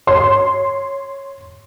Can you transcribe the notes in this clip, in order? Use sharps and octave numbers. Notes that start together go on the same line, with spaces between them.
C#5 C6